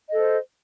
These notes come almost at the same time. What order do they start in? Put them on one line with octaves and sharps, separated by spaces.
D#5 A4 C5